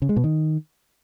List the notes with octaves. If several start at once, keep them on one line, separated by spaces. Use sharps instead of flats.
C#3
G#3
B2
D#3